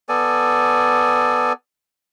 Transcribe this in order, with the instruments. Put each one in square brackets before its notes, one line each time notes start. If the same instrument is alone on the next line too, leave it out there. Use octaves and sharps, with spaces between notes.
[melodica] B3 A4 D5 G#5